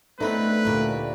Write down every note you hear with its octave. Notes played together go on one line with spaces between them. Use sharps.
A2 A3 B3 C4 D4 D#4 B4
D2 A#2 G4